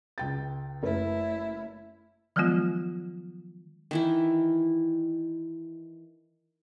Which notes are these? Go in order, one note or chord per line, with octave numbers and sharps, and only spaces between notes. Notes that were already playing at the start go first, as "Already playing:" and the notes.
C#2 G5 A6
F#1 A3 E4 A#4 B4
D#3 F3 F#3 G#3 B3 F4
D#3 E3 E4